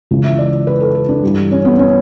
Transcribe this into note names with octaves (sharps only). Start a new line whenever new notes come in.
C#2 C#3 E3
E5
D5
B4
A4
A4
D4
G2 E3 G3
C#4
B3
C#4